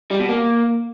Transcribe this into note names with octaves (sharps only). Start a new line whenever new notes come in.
G3
B2
A#3